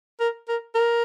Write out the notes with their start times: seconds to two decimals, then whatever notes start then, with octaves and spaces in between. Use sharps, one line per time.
0.20 A#4
0.48 A#4
0.75 A#4